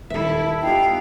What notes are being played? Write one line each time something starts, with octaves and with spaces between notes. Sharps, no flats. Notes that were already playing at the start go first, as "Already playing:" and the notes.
D#1 G3 E4 A4 E5
B3 D#4 F4 G4 F5 G5